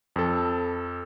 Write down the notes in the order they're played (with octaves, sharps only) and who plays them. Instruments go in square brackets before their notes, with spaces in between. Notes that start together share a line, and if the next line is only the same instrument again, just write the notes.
[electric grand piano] F2 A4